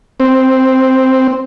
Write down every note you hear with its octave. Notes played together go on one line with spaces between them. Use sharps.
C4